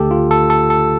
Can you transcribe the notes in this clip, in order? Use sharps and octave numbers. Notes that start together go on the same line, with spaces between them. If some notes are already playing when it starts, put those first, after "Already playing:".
Already playing: D2 D3 A3 G4 A4
F4
A4
A4
A4